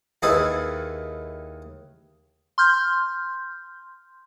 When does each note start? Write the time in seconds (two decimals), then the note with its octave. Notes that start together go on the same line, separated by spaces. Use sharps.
0.22 D#2 D#3 E4 G#4 B4 A5
2.58 C6 F6 G6